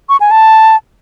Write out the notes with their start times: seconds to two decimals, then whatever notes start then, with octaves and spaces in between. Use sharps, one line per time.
0.09 C#6
0.20 G#5
0.31 A5